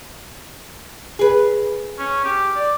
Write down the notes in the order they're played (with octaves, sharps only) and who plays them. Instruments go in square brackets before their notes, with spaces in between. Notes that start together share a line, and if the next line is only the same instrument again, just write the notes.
[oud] G#4 B4
[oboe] C#4
G4
D5